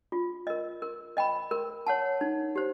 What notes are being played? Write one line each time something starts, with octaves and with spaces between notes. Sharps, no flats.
F4
A#4 D#5
A#4
D#5 G5 B5
A#4
C#5 F#5 A5
D#4
G4 C5